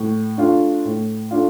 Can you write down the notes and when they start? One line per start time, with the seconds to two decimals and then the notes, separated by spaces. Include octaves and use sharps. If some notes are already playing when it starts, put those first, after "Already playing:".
Already playing: A2
0.37 A3 D4 F4
0.85 A2
1.31 A3 D4 F4